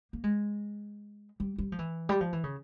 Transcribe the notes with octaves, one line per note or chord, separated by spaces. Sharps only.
A#3
G#3
G3
G3
F3
E3
G3
F3
E3
C#3